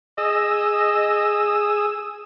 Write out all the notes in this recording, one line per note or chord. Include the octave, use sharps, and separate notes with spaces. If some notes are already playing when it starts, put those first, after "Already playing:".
G#4 D#5 D#6 E6